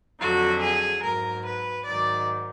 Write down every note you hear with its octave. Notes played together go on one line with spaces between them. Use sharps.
F2 D3 F#3 F#4
G#4
G#2 F#3 A#4
B4
G#2 D#3 F#3 D5